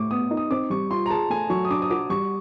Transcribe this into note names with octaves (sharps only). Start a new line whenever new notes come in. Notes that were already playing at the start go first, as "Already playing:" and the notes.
Already playing: A2 C#6 D6
B3 D#6
D#4
D#6
C4 D6
G3 C#6
F4 C6
A#5
G#4 A5
A3 G#5
F#3 C#6
D#6
D4 D6
D#6
F#4 D6
G3 C#6